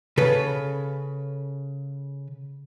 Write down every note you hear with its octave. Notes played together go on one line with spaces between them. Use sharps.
C#3 A4 B4